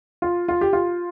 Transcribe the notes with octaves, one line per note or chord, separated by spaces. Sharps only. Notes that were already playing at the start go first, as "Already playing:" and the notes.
F4
F4
G4
F4